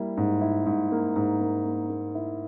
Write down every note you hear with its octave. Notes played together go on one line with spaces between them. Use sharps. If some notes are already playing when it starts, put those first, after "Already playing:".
Already playing: G3 A#3 E4
G#2
E4
G#2
A#3
G#2
A#3
A#3
A#3
E4